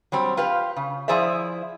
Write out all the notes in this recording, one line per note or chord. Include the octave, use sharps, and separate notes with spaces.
F#3 G3 C4
F4 G4 B4 F5
C#3
F3 E4 G#4 C5 D5 E5